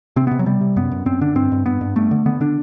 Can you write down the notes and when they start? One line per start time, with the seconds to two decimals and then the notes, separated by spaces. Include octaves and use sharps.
0.16 C3 C4
0.27 C3 B3
0.39 F#3
0.46 C3 G3
0.61 C3
0.76 F#2 B3
0.91 F#2
1.06 F#2 C4
1.21 D3 D4
1.36 G2 C4
1.52 G2
1.66 G2 B3
1.81 G2
1.96 G2 A3
2.11 D3
2.26 D3 B3
2.41 D3 D4